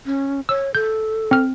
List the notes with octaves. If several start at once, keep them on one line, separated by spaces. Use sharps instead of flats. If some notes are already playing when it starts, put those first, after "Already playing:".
C#4
C#5 E6
A4 G6
C4 F6